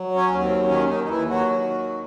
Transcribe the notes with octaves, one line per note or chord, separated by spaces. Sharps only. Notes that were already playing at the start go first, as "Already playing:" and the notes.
Already playing: F#3
C#4
D#2
C4
D#3 C#4
D#3 D#4
D#4
D#2 E3 E4
F#3 F#4
D#3